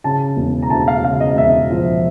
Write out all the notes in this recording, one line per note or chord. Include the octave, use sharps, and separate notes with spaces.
C#3 A5
E1
A#5
D2 A5
F5
C#3 F5
D#5
E1 E5
F3